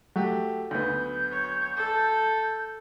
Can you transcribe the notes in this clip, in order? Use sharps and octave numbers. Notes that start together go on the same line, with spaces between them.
F#3 A3 G4
D2 B3 G6
C#5
A4